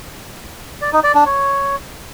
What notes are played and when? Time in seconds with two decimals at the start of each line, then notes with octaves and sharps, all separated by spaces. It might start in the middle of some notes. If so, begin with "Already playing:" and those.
0.82 D5
0.93 D#4
1.04 D5
1.15 D4
1.26 C#5